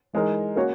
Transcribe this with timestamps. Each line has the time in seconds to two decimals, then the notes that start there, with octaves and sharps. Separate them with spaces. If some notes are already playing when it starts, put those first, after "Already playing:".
0.13 E3 G#3 D#4 A#4
0.56 A#3 C#4 F#4 C#5